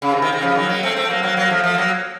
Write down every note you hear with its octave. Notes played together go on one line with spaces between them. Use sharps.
C#3
C3 D#3
C3 D#3
C3 D#3
C#3 F3
D#3 F#3
F#3 A#3
A3 C4
A3 C4
F#3 A#3
F#3 A#3
F#3 A#3
F3 A3
F3 A3
F#3 A#3